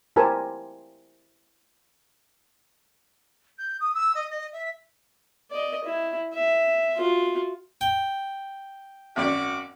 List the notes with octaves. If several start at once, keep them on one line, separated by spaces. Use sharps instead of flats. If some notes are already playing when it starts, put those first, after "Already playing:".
E4 G4 A#4 C5 G#5 A5
G6
D#6
E6
D#5
D#5
E5
D5 D#5
E4
E5
F4 F#4
G5
G#1 F#2 F#4 D5 F#5 D6